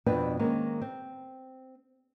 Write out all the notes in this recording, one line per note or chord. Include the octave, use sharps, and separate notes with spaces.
F2 B2 B3 C4 D4 B4
D#3 G#3 A#3 C4 C#4
C4